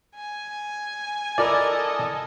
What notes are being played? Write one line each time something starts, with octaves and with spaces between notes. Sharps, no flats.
G#5
E4 A4 A#4 D5 D#5